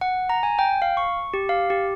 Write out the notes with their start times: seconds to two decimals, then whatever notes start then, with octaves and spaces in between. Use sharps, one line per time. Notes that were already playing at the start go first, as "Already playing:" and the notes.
0.01 F#5
0.29 A#5
0.43 G#5
0.59 G5
0.82 F5
0.97 C#6
1.34 G4
1.49 F5
1.70 G4